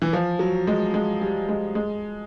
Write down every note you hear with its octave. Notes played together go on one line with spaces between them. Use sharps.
E3
F3
F#3
G#3
G#3
G3
G#3
G#3